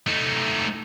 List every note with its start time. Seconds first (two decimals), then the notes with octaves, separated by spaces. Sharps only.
0.07 A3 D#4